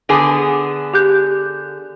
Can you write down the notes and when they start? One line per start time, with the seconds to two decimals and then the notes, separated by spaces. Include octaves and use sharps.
0.09 D3 B3 G#4
0.94 G4 F#6 G6